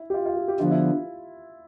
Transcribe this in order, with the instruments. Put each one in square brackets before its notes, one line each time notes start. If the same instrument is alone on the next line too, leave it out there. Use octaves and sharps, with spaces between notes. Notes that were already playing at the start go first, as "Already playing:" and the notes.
Already playing: [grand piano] E4
G4
F4
F4
G4
G4
[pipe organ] D3 F3 B3 [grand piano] F4
[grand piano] E4